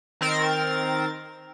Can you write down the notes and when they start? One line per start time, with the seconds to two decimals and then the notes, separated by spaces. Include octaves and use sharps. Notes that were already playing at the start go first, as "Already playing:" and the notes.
0.21 D#3 C4 A#4 A6